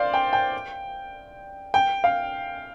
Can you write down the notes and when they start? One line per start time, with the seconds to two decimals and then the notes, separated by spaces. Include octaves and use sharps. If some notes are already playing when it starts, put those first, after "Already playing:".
Already playing: C5 D5 F5
0.14 G5
0.33 G5
1.74 G5
2.04 F5